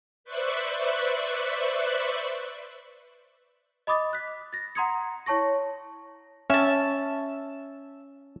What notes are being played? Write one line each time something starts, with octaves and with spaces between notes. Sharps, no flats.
B4 C5 D5 E5 C#6 F#6
D#5 B5 D6 D#6 A6
F#6 B6
A6 A#6
F#5 A#5 C6 D#6 G#6 C#7
E4 C#5 A5 C#6 A#6
C#4 E5 A5